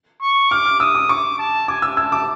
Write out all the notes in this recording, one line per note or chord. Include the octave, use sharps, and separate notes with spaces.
C#6
D6 F6
F6
D#6 E6
D6
C#6 D6
A5
G#5 D6
E6
A5 E6
D6